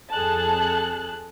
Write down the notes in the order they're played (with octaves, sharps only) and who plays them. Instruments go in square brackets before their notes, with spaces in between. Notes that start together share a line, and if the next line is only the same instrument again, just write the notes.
[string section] F2 G#4 A4 A5 F#6